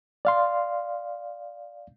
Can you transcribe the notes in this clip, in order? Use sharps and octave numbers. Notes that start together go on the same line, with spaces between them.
D5 F5 C6